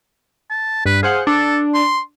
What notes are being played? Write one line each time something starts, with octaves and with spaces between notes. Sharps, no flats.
A5
G2 B4
G#4 C5 F5 F#5
D4 A4
C6